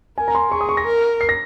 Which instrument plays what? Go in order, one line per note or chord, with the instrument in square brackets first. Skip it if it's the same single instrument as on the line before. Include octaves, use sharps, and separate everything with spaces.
[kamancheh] A#4 [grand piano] G#5
[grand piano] A#5
C6
[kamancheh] G#4 [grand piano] C#6
[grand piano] D#6
C#6
A#6
[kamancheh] A#4
[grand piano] C7
A#6